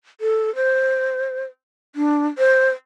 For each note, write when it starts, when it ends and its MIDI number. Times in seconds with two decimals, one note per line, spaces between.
0.21 0.53 69
0.55 1.45 72
1.96 2.27 62
2.38 2.70 72